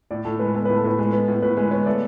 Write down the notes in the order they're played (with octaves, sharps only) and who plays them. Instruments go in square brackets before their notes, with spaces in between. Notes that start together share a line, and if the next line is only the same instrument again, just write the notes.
[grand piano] A2 [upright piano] D5
[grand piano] A2 [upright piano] A4
[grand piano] G#3 [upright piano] B4
[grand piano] B3 [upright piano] A4
[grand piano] A2 [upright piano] B4
[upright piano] A4
[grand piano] A2 [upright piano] B4
[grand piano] G#3
B3
A2
[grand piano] A2 [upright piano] B4
[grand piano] G#3 [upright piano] B4
[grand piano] B3 [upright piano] C#5
[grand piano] A3 [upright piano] D5